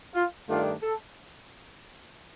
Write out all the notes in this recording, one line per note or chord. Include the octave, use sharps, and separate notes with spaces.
F4
G2 D#3 A3 D4 F4
A4